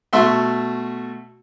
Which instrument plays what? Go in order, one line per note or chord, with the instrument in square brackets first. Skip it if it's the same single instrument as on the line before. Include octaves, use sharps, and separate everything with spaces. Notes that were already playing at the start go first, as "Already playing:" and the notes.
[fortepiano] B2 A3 F#4 E5 C6